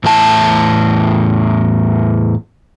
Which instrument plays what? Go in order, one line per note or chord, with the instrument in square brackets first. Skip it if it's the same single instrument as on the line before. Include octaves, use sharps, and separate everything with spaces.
[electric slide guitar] E2 A2 E4 A5